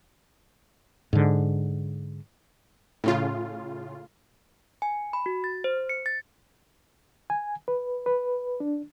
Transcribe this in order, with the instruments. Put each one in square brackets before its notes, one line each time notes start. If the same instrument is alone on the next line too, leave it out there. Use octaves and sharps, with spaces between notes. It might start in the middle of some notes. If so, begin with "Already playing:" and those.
[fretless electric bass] G#2 D3
[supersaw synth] A2 C#3 F4
[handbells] G#5
B5
F#4
A6
C5
C#7
A6
[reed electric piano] G#5
B4
B4
D4